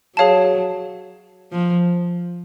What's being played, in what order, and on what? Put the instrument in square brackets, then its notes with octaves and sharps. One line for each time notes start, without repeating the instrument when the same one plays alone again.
[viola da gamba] F#3 [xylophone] G#4 C#5 F5 A5
[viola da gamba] F3